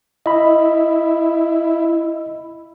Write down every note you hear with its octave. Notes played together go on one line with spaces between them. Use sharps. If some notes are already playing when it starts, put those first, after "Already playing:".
E4 D#5 B5